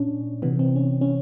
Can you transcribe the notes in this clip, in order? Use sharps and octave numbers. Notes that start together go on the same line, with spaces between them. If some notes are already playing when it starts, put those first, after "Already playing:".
Already playing: A#2 C#4 D4
C3 E3 B3
C4
C#4
C#4